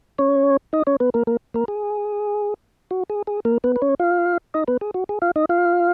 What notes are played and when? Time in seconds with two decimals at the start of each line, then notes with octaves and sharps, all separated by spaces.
0.18 C#4 C#5
0.73 D#4 D#5
0.87 C#4 C#5
1.00 B3 B4
1.14 A#3 A#4
1.27 A#3 A#4
1.54 A#3 A#4
1.68 G#4
2.91 F#4
3.10 G#4
3.27 G#4
3.45 A#3 A#4
3.64 B3 B4
3.76 B4
3.82 C#4 C#5
3.99 F4 F5
4.54 D#4 D#5
4.68 B3 B4
4.81 G#4
4.94 F#4
5.09 G#4
5.22 F4 F5
5.36 D#4 D#5
5.49 F4 F5